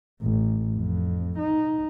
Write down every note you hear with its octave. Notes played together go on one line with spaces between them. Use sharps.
A1
F2
D#4